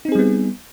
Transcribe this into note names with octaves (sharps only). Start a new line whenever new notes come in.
G3 B3 C4 D#4 G#4